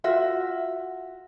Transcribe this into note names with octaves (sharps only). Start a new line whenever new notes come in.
F4 F#4 E5